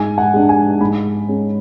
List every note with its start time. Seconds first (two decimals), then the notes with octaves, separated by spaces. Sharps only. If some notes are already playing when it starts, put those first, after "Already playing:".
Already playing: G#2 G#5
0.18 F#5
0.34 G#3 D4
0.49 G#5
0.81 G#2 B5
1.28 G#3 C#4